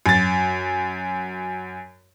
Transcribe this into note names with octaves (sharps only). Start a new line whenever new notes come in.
F#2 A6